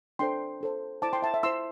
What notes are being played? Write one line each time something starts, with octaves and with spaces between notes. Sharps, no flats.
D4 A4 C5 G5 C6
D4 A4 C5
E4 C5 A5 D6
G5 C6
E5 A5
E5
E4 C5 C6 E6